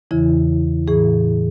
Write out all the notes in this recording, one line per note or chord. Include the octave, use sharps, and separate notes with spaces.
E2 C#3 E3 E4
A2 E3 G#4